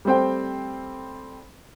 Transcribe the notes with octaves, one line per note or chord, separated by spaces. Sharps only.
G3 A3 C4 C5 G5